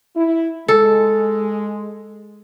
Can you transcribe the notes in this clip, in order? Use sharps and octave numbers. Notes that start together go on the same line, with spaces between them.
E4
G#3 A4